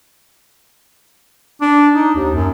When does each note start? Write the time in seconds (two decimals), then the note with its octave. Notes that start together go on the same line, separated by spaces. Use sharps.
1.61 D4
1.93 D#4
2.15 D#2
2.34 F#2